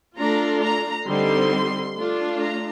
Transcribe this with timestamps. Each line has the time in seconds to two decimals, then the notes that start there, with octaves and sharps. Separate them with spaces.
0.17 A3 D4 F4 A#5
0.61 A#5
1.05 D3 G3 C4 D#4 C6
1.95 A3 D4 F4
2.39 A#5